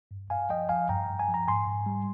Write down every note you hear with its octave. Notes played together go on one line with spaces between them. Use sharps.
G2
G2 F5 G#5
F3 D#5 G5
F3 F5 G#5
G2 G5 A#5
G2
G#5
F3
A#5
G#2 G#5 C6
G#2
G3